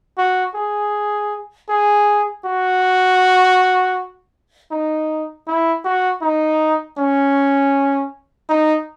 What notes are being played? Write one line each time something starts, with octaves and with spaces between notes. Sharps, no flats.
F#4
G#4
G#4
F#4
D#4
E4
F#4
D#4
C#4
D#4